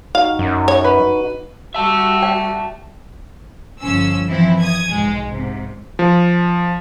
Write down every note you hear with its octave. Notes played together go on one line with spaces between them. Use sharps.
D#4 F#4 F5
F#2
C#5
B4
G3 F#4 G4 E5 A5 E6
D5 G5
G1 F3 C#4 E6
E3 F3 C4 E4
D#6 G#6
B1 G#2 G#3
G#2 C3
F3